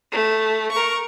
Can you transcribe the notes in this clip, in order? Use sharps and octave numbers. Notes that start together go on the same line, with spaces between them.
A3
A#4 C#6